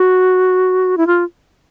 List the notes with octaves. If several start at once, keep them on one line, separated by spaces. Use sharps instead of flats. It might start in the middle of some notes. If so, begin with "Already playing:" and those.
Already playing: F#4
E4
F4